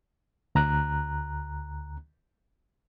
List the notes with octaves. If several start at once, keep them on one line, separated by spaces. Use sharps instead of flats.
D2 A#5 F#6